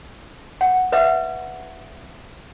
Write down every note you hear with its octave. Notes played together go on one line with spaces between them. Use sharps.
F#5
B4 D#5 E5 F#5